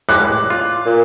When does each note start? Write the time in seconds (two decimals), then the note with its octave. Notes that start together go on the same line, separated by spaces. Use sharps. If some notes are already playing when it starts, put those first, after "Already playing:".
0.09 A2 G3 G#3 D6 F#6
0.50 F4
0.86 A#2